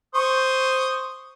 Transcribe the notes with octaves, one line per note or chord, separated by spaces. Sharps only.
C5 C#6 D#6